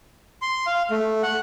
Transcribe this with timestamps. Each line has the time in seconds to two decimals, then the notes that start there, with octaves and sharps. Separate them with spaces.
0.42 C6
0.66 F5
0.91 A3
1.23 F#5